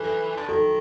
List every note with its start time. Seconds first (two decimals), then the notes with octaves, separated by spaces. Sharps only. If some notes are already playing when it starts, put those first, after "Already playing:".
Already playing: E3 A4
0.37 D3
0.48 D#3 A4